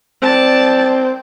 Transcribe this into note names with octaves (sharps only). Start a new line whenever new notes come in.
C4 D5 A5